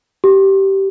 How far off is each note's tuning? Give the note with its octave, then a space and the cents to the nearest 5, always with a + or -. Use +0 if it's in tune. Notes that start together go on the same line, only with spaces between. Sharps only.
G4 -15